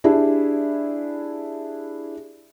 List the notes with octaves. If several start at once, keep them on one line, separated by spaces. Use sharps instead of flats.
D4 E4 G4 G#4 E5